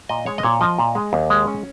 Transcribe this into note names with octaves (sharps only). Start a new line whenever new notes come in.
A#2 D#5
G#3 C#5
D#5
A#2 C#5
F3 D#5
A#2
G#3
D#2
G#3
C#4